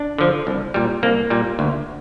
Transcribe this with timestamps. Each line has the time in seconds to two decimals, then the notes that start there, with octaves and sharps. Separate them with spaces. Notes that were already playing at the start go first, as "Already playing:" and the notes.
Already playing: D4
0.18 D3 F3
0.47 C2
0.74 A#2 G3
1.03 C2 A#3
1.30 A#2 G3
1.59 D2